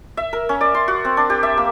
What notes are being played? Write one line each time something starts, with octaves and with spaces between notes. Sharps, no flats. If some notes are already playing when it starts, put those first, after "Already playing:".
E5
A#4
C#4
D5
C6
F#4
C4
D4
G4
E5
A#3